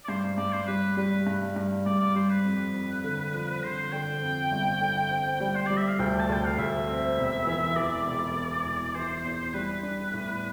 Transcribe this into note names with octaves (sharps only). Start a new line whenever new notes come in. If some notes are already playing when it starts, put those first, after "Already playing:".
D5
G2 C5
G2 D5
C5
G3 B4
G3 B4
G2
G2
G2 D5
D5
G3 C5
B4
F2
F2
D3
F3
D3 C5
D3 G5
F2
G1
D3
C4
G3 G5
C5
G3 D5
E5
F5
D2 G5
A5
D2 G5
F5
D2 E5
C4
E1
E3
E3 D5
E1
E1
E1
E3 C5
E2
G3 B4
D4
A2